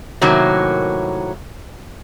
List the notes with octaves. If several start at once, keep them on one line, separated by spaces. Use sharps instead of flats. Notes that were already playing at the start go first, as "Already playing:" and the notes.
A2 C3 D#3 F#3 A#3